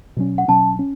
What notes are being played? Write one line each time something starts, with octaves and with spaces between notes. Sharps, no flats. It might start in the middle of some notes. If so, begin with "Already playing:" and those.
B2 F#3 C#4
F#5
B2 F#3 C#4 A5
C#4